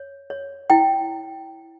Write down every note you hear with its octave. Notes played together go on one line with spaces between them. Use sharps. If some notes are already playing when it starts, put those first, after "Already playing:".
Already playing: C#5
C#5
E4 G5